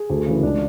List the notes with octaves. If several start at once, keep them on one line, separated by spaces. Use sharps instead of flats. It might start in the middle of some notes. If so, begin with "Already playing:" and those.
Already playing: G#4
D2
C#3 E3
C#2 D4